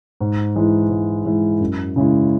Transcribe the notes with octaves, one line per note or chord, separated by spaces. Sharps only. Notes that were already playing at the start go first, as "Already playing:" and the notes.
G#2
E3 G#3 E4
G#2
E3 G#3 E4
F#2
C#3 G#3 E4